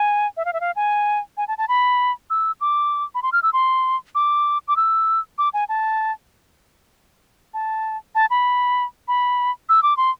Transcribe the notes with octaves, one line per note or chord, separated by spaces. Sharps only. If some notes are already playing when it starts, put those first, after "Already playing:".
Already playing: G#5
E5
F5
E5
F5
G#5
G#5
A5
A5
B5
E6
D6
B5
C6
F6
E6
C6
D6
D6
E6
D6
G#5
A5
A5
A5
B5
B5
E6
D6
C6